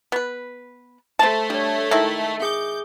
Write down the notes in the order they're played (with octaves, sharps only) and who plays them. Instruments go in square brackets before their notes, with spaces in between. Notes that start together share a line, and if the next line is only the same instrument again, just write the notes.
[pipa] B3 B4
[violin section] A3 [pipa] C5 A5
[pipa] G3 [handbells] D4 C#5
[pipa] D#3 G#3 E4 [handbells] E5
[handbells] G#4 D6 [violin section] G6